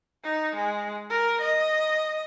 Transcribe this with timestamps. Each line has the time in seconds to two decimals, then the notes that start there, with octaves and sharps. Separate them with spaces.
0.24 D#4
0.55 G#3
1.10 A#4
1.41 D#5